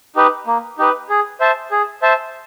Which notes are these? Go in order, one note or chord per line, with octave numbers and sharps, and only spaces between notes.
D#4 G4 B4
A#3
D#4 G4 B4
G#4
C5 E5 A5
G#4
C5 E5 A5